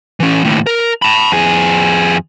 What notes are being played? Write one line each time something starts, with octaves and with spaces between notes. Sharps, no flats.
E3 C#4
D#2 A2
A#4
A5 B5
F2 G#4